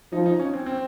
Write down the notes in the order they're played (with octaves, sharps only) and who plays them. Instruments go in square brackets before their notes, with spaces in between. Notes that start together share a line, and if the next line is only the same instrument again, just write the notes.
[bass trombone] F3 [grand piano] D#4
[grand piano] D#4
C#4
C4
C4